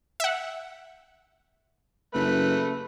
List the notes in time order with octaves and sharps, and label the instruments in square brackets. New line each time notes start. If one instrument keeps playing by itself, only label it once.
[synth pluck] E5 F#5
[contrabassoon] F#1 [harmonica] A3 B4